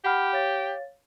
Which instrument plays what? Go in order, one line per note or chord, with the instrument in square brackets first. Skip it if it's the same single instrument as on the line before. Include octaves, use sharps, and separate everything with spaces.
[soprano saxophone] G4 [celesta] F#5 B5 F6
[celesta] C#5 F5 A6